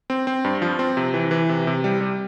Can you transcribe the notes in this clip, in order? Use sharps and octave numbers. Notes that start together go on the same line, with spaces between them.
C4
C4
G2
F3
C4
C3
E3
E3
C3
C3
G3
G3